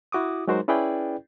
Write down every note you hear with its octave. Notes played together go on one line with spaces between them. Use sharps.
E4 F#4 D6 D#6
F#3 G#3 D#4 F#4 A#4 C5
C#4 E4 G#4 B4 D5 G5